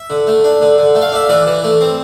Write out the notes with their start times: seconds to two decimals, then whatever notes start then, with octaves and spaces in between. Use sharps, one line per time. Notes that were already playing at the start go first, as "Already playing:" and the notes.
Already playing: E5
0.10 D3
0.27 A3
0.44 D4
0.62 D3
0.78 D3
0.95 A3
1.02 F5
1.12 D4 E5
1.29 E3 D5
1.47 E3
1.64 A3
1.81 C4